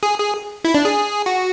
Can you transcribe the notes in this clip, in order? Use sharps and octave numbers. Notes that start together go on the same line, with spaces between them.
G#4
G#4
E4
D4
G#4
F#4